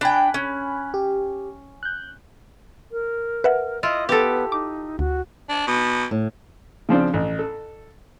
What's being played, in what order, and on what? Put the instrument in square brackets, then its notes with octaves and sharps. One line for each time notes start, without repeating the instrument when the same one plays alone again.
[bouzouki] D4 G5 [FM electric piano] G#5 B5 F#6
[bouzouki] C#4
[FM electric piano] G4
F#6 G6
[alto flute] A#4
[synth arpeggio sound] B4 E5 F#5
[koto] E4 F4 [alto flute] D#5
[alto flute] B3 [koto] G4 A4
[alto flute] D#4 [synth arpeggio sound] D6
[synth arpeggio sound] D2 [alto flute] F#4
[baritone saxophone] D4
B2
[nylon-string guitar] A2
[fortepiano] C#3 F3 C4 D4
A1
A4